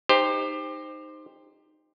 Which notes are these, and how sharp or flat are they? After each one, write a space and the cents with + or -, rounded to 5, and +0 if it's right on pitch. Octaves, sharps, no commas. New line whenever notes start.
D#4 -5 G4 +25 C5 +0